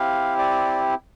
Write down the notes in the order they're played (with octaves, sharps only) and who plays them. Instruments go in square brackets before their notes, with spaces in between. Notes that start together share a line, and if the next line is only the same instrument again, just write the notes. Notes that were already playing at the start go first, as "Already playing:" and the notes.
Already playing: [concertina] C4 E4 G4 F5
D5